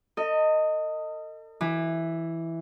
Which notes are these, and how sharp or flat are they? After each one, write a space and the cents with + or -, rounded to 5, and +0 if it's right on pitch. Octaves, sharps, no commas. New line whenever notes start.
A4 +45 D#5 +0
E3 +0 D6 +20